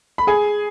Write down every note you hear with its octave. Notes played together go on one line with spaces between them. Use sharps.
B5
G#4 G#5